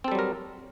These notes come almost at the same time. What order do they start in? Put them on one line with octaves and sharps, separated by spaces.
C4 A4 G3 F#3 A#4